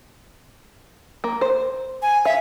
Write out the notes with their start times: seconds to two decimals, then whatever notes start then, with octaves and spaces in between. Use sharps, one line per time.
1.24 A#3
1.41 C5
2.02 G#5
2.25 E5 F5